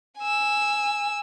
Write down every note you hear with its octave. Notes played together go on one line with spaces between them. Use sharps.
G#5 E6